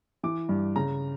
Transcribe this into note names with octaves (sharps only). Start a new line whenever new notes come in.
E3 D6
G2
C#3 A#5